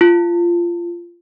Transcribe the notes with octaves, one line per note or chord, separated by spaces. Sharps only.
F4